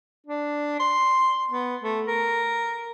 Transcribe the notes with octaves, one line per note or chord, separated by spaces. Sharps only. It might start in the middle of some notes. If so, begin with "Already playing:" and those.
D4
C6
B3
A3
A#4